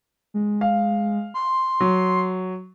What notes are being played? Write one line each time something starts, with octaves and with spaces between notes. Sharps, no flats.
G#3
F5
C6
F#3